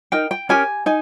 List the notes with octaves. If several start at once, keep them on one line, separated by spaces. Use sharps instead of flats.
D#4 A#4 G5
G5
C#4 G4 A#4 G#5
D#4 G#5